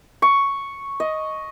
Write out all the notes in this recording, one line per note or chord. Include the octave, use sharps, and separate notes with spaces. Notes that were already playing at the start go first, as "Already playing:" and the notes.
C#6
D#5